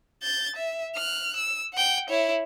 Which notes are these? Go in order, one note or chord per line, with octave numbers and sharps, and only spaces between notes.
G6 A6
E5
F6 F#6
E6
F#5 G5
E4 C#5